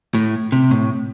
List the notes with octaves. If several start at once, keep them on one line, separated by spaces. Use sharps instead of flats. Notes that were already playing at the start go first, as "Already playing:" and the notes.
A2
C3
A2